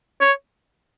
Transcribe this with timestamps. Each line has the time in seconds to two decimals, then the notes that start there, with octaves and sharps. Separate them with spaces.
0.21 C#5